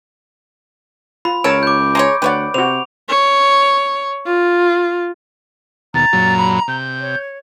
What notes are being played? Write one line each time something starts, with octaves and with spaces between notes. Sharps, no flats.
F4 B5
C#2 A#4 C#5 A5 E6 D7
D6 G6
G#3 G#4 C#5 A#5
D2 B4 C#5 D5 F#5 G5
C3 F#4 C5 F7
C#5
F4
D#2 B2 A#5 A6
F#2 A#2 F#3
B5
C3 G6
C#5